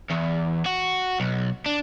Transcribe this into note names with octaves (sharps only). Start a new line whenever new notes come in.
E2
F#4
B1
D4